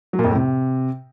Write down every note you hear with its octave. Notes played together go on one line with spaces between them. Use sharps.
F#3
A#2
F2
A2
C3